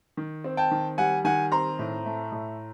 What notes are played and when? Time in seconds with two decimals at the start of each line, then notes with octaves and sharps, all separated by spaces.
0.17 D#3
0.44 C4
0.57 G5 A5
0.71 D#3
0.98 G3 F#5 G#5
1.24 D#3 F#5 G#5
1.52 C4 A#5 C6
1.79 A2
2.06 A3
2.32 A2